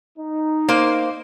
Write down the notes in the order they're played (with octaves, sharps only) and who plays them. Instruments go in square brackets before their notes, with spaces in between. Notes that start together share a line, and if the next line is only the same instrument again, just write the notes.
[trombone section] D#4
[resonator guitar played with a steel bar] A#3 C5